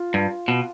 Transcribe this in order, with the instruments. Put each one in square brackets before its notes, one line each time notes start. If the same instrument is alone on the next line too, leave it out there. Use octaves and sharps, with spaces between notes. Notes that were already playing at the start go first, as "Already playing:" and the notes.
Already playing: [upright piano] F4
[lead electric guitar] G2
B2